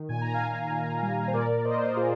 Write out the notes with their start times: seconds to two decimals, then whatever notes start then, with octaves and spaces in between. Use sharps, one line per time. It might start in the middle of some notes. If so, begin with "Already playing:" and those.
Already playing: D#3
0.09 A#2 G#5
0.21 A#5
0.34 F5 G#5
0.41 A#2
0.71 A#2
1.02 G3
1.28 C5
1.34 A#2 A#4 D5
1.65 A#2 C5 D#5
1.78 C5
1.88 A#4
1.96 A#2 F4 G#4